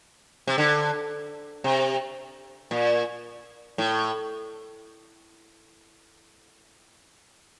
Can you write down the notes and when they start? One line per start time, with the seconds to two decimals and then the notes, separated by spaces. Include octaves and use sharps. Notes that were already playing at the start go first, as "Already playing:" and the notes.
0.47 C3
0.58 D3
1.64 C3
2.71 A#2
3.78 A2